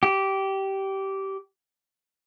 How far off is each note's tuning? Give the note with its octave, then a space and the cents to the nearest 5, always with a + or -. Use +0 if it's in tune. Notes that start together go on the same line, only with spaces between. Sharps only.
G4 -20